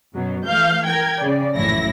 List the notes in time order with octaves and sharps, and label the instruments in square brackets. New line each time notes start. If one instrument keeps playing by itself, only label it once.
[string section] F#2 B2 F#3
E3 A3 F5 G6
A#4 G5 G#6
C#3 D5
A#1 F#2 A2 E3 E4 A#6